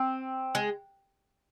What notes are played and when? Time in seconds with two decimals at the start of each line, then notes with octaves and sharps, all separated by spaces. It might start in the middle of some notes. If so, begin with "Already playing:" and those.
Already playing: C4
0.55 G#3